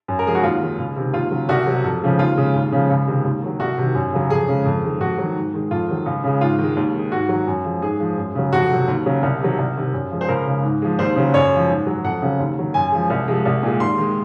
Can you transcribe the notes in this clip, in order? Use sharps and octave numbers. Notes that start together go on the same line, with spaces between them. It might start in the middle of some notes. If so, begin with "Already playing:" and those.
F#2
A#4
F3 G#3 G#4
F#4
D#2 F4
D#3 G#3
C#2
C3 D#3 G#3
D#2 F4
C#3 F#3
C2 F#4
C3 F#3
F2
C#3 F3 G#3
D#2 F4
C#3 G#3
D#2
C#3 F3 G#3
C#2
C3 D#3 G#3
D#2
D#3 F#3
C2 F#4
C3 D#3
F#2
C#3 F#3
F2 G#4
C#3 G#3
F2
D#3 G#3
F2 F#4
D#3 F#3
G#2
D#3 G#3
F2 F4
D#3 F#3
C#2
C#3 G#3
G#2 F4
D#3 G#3
D#2
D#3 G#3
G#2 F#4
D#3 F#3
F#2
F3 G#3
G#2 G#4
F3 G#3
F#2
C#3 F#3
F2 F#4
C3 F#3
D#2
C#3 F#3
C2
C3 D#3 F#3
C2
C3 D#3
F#2
F3 G#3
C5
C#2 A#4
C#3 G#3
G#2
F3 G#3
D#2 C5
C#3 F#3
F#2 C#5
F3 G#3
G#2
F#3
F2 F#5
C#3 F#3
D#2
D#3 F#3
F#2 G#5
F3 G#3
C2
C3 F3 G#3
C2
A#2 G#3
D#2 C6
D#3 G#3